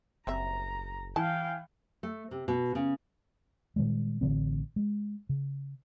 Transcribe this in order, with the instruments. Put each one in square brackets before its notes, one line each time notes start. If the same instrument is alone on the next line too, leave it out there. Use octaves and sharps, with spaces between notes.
[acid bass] F#1 [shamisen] G3 C4 E5 [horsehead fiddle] A#5
[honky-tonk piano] E3 [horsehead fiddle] F5 G5 [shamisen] A5
[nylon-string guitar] A3
C3
B2
C#3
[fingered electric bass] A#2 D#3 G3 G#3
A1 D3 D#3 C4
G#3
C#3